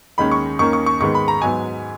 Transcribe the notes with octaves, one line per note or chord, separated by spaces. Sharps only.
D#2 D#3 G#3 C#4 B5
C#6
D#2 D#3 A#3 C#4 C#6
C#6
C#6
G#2 D#3 G#3 B3 C#6
B5
A#5
G#2 F#3 B3 G#5